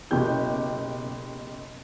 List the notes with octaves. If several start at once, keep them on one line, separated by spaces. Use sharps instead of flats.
F#1 B2 G4 G6